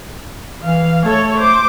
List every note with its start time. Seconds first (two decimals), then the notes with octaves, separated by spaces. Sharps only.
0.62 E3 F5
1.04 A3 A4 C#5
1.38 C5 D6